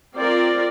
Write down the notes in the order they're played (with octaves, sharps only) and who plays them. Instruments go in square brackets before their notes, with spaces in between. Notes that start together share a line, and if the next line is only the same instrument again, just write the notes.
[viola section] C4 F4 A#4 D5